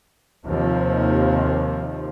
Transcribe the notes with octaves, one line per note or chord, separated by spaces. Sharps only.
D#2 C3 F3